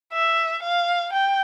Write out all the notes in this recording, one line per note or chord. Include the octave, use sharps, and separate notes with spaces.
E5
F5
G5